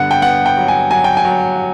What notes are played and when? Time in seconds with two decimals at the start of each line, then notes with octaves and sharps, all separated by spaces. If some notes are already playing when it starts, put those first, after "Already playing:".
Already playing: G2 D3 B3 F#5
0.11 G5
0.22 B3 F#5
0.46 G5
0.57 F#3
0.68 G#5
0.91 F#3 G#5
1.04 G5
1.17 G#5
1.25 F#3